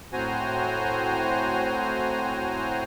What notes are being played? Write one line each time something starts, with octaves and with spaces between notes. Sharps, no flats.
A2 C4 F#4 C5 G#5 A#5